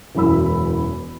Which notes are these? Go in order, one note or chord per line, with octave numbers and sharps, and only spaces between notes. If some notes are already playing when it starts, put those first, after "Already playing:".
E1 F#2 E3 F#4 B5 E6